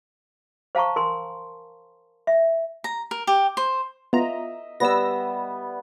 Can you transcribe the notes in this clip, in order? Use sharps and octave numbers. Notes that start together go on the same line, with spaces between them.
C5 F5 A5 A#5 C#6
A#4 G#5 C6
E5
A#5
A#4
G4
C5
B3 F4 D#5 E5 A#5
G3 B3 B4 E6 A#6